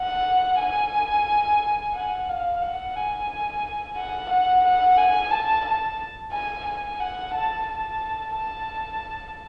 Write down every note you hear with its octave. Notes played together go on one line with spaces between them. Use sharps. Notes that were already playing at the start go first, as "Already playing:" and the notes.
Already playing: F#5
G#5
F#5
F5
F#5
G#5
F#5
F#5
F#5
G#5
A5
A5
G#5
G#5
F#5
A5
A5
A5